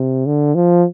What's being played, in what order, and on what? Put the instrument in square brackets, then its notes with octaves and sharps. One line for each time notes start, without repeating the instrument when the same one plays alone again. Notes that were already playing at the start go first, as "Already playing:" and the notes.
Already playing: [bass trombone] C3
D3
F3